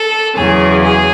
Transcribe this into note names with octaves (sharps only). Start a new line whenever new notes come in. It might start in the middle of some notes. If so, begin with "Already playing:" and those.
Already playing: A4
E2 C#3 F#3 G#4
G#4